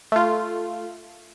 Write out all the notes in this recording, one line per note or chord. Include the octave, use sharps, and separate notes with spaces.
A3 F4